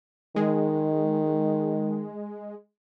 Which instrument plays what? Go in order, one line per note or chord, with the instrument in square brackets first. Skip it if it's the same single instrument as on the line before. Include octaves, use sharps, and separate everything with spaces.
[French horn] D#3 [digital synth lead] G#3